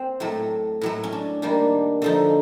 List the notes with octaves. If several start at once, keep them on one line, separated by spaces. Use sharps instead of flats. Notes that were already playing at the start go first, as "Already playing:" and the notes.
Already playing: C4
A2 F#3 A3
A2 F#3 A3
C#4
D4
D#3 G3 A#3 D4
D3 F3 A3 D#4